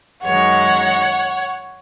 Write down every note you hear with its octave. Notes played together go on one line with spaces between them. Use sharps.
F#2 D#3 G#3 C#5 F#5